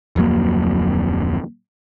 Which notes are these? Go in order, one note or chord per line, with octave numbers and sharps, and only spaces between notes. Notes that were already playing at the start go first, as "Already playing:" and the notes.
D1 F2 F#3 A#3